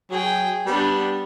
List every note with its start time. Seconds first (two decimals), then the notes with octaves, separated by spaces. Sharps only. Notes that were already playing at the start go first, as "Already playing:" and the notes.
0.11 F#3 G#4 G5
0.66 G3 B3 D4